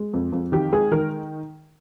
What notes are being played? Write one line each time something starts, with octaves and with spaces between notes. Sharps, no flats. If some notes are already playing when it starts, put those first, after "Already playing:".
Already playing: G#3
F2
F2
D#3 G4
G#3 G#4
D#3 A#4